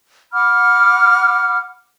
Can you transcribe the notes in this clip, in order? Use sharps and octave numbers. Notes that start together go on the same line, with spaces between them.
F#5 B5 D6 F6